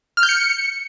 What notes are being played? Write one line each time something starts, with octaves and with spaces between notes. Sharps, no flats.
F6
G6
C#7